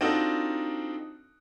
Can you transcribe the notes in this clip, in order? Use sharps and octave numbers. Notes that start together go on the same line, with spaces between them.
C4 D4 D#4 F4 F#4 A4